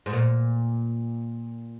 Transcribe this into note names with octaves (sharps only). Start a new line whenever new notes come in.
G#2
A#2